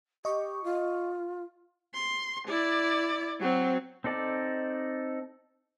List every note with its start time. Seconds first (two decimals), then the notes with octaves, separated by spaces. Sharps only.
0.25 G4 D#5 C#6
0.64 F4
1.94 C6
2.48 E4 D5
3.40 F#3 C4
4.04 C4 D#4 A4 D5